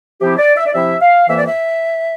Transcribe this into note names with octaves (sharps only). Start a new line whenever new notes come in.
C3 F3 C4 E4 G4
D5
E5
D5
C3 F3 C4 E4 E5
F5
F2 E3 A#3 E5
D5
E5